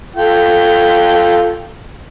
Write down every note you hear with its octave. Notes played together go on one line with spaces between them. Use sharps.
F4 A4 G5